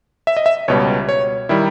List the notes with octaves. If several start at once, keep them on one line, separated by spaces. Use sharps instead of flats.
E5
D#5
E5
C#2 B2 G3 C#5
C#5
D#3 G3 E4